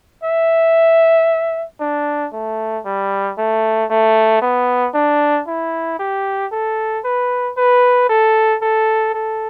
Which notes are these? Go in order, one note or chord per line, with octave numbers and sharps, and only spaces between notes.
E5
D4
A3
G3
A3
A3
B3
D4
E4
G4
A4
B4
B4
A4
A4
A4